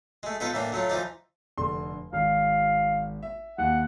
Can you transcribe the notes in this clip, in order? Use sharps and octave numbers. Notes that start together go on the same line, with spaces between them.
G#3 A3
B3 D#4 F4 A4 B4
A2 E3 A#3 D4
F#3 A3 F4
E3 F3 D#4 D5
F1 D3 C6
G#1 F5
E5
D#2 F#5